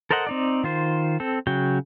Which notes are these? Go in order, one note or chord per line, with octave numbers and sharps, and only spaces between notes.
A4 A#4 C5 D#5 F#5
C4 D#4 D5
D#3 F4 C5
C4 A4
C#3 F#3 F#4 G5